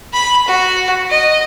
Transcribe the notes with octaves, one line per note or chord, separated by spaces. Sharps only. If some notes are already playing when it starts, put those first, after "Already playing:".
B5
F#4
D#5